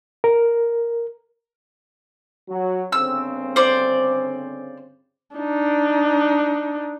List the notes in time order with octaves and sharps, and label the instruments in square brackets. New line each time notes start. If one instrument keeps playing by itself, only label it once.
[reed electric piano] A#4
[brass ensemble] F#3
[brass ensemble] G1 C#3 C4 [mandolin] E6
[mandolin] C5 D5
[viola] D4 D#4